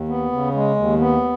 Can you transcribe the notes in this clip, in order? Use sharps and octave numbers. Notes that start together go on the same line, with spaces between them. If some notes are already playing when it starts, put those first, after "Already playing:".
Already playing: D#2
B3
C#3
G#3
D#2
B3